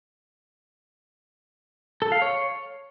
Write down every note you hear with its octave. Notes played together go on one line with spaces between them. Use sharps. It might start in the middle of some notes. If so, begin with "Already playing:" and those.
A4
F5
C#5